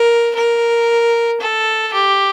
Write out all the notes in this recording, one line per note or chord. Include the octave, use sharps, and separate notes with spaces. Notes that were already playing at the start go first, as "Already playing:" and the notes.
Already playing: A#4
A#4
A4
G4